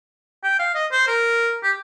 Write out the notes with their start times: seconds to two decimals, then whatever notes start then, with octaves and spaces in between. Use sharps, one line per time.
0.43 G5
0.59 F5
0.75 D#5
0.92 C5
1.08 A#4
1.63 G4